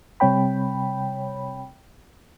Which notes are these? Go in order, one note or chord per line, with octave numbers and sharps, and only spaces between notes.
C3 G3 C4 C#5 G5 B5